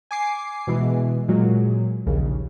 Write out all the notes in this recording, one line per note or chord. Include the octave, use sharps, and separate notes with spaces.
G#5 D6 C7
B2 E3 G#3
A#2 F#3 G#3
A#1 D#2 C#3